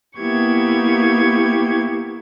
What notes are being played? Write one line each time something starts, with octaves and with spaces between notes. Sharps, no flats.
A#3 B3 E4 G4 C#6 G#6